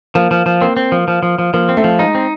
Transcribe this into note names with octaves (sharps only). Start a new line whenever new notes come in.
F3 A#3
F3
F3
A#3 C4
C4
F3
F3
F3
F3
F3 A#3
C4
A3
F3
G#3 D#4
C4